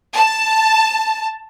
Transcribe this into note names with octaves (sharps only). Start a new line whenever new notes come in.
A5